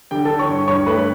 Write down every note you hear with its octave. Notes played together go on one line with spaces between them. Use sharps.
D3 G4 G5
D3 A4 A5
C#5 C#6
G2
G2 C#5 C#6
A3 B4 B5